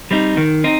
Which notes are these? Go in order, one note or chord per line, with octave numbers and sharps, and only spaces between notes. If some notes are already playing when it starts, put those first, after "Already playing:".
G3 C4 D#4
D#3
C4 D#4